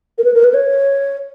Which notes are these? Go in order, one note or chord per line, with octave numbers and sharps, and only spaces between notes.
A#4
B4
A#4
B4
C#5